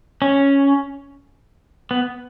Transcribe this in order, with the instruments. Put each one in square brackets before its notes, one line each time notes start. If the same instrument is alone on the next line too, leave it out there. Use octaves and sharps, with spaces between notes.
[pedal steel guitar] C#4
B3